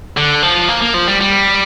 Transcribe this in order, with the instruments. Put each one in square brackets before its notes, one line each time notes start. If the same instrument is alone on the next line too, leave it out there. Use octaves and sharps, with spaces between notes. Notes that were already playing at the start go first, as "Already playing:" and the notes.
[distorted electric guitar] D3
F3
A#3
A#3
F3
G3
G3